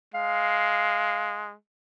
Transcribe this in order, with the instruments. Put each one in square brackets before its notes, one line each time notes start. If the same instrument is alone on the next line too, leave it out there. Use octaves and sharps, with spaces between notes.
[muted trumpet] G#3 [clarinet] F5